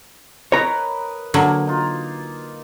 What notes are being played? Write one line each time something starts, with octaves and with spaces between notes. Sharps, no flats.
A#4 B4 C#5 D#5 A#5
D3 F#3 A#3
D#4 F4